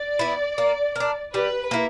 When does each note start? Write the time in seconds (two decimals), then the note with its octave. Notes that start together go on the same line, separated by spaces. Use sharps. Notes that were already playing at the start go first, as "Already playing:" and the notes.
Already playing: D5
0.19 B3 E4
0.58 A#3
0.96 D4 A#4
1.34 G3 B4
1.71 A#3 E4